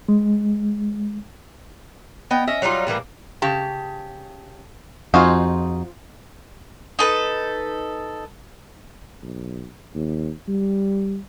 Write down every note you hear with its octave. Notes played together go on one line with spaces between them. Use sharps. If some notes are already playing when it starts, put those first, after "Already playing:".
G#3
B3 D#5 G5
C#4 D#5 E5
F#3 G3 D#4 F4
A2 E3 G3 A#3
C#3 G4 A5
F2 D#4 F4 F#4 G#4 C5
D#4 A4 B4
B1
D#2
G3